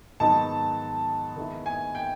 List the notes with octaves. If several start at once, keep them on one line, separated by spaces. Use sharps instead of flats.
G#2 D#3 F#3 B3 D#4 A5
D#3 G#3 B3 E4
G#5
G5